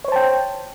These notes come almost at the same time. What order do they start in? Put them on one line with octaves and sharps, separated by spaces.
C#5 C5 A5 G5